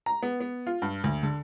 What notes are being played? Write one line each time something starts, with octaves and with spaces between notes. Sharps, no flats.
A#5
B3
B3
F4
G2
D2
D3